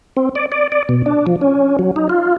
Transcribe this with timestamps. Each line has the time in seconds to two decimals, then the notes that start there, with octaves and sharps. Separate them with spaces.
0.17 C4
0.35 D5
0.52 D5
0.72 D5
0.89 B2
1.06 D4
1.27 F3
1.41 C#4
1.79 F#3
1.96 D#4
2.09 F4